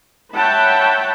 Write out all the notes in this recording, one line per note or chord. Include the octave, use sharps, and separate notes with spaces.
C#5 E5 F#5 G5 A5 B5